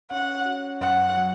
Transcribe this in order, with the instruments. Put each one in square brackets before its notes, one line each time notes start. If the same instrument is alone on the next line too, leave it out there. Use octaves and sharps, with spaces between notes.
[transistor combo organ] C#4 [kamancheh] F#5
[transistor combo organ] F#4
[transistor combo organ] F#2 [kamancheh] F#5
[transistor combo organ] F#3